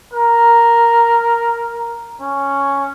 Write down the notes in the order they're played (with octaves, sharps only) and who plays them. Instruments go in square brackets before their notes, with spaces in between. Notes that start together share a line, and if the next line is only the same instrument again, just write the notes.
[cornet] A#4
C#4